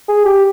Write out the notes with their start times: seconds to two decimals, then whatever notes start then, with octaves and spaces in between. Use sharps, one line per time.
0.08 G#4
0.25 G4